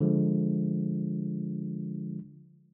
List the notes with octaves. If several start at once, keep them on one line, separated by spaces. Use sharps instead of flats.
D3 F3 G#3